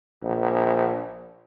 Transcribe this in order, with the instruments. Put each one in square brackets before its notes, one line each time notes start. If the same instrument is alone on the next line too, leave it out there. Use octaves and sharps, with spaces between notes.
[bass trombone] A#1